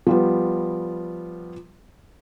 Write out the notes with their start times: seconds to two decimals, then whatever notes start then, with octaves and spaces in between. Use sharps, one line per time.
0.07 F3 G3 B3